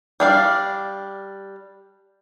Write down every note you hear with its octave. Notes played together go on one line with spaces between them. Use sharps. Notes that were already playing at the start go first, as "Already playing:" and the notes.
G3 D4 F5